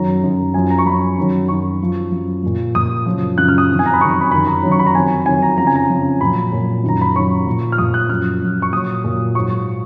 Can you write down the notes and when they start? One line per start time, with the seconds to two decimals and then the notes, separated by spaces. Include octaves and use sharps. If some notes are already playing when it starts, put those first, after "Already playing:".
Already playing: F#2 D#3 F#3 A#5
0.23 F#2 D#3 F#3
0.54 F#2 F3 G#5
0.70 A#5
0.78 C#6
0.85 F#2 F3 B5
1.18 F#2 D#3 F#3
1.48 F#2 D#3 F#3 C#6
1.80 F#2 F3
2.12 F#2 F3
2.43 A#2 F3
2.74 A#2 F3 D#6
3.06 F#2 C#3 F3
3.38 F#2 C#3 F3 F#6
3.48 F6
3.58 D#6
3.70 F2 D#3 F#3
3.79 G#5
3.86 A#5
3.94 B5
4.01 F2 D#3 F#3 C#6
4.11 C#6
4.21 B5
4.31 F#2 D#3 F#3 B5
4.47 A#5
4.63 F#2 D#3 F#3
4.72 C#6
4.79 B5
4.86 A#5
4.95 F2 D#3 F#3 G#5
5.26 F2 D#3 F#3 G#5
5.42 A#5
5.58 F2 C#3 F3 A#5
5.67 G#5
5.76 A#5
5.90 F2 C#3 F3
6.21 A#2 F#3 B5
6.52 A#2 F#3
6.84 F#2 D#3 F#3 A#5
7.01 B5
7.16 F#2 D#3 F#3 C#6
7.46 A#2 F3
7.72 F6
7.78 A#2 F3 D#6
7.94 F#6
8.09 F#2 F3 F6
8.41 F#2 F3
8.62 C#6
8.72 A#2 F#3 D#6
9.04 A#2 F#3
9.35 G#2 F#3 C#6